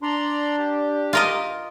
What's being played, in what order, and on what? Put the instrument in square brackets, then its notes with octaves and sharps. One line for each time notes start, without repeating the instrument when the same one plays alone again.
[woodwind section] D4 [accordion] D5 A#5 C6
[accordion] G4
[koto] F4 A#4 D#5